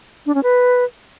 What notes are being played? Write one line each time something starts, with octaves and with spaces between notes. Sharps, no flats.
D4
C#4
B4